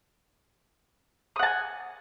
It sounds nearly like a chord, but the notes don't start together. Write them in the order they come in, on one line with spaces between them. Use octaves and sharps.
D#6 F#5 A5 G#5